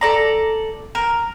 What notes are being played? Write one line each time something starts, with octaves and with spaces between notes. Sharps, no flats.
A4 D5 A#5
A#4